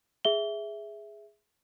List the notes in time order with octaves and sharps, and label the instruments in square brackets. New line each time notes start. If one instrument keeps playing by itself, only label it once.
[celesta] G#4 E5 G7